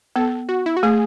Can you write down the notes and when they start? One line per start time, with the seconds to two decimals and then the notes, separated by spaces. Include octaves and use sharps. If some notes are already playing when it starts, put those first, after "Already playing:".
0.16 B3 A4
0.49 F#4
0.66 E4
0.77 F#4
0.83 A3 G#4